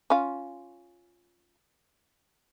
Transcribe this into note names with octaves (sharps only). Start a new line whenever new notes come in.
C#4 F4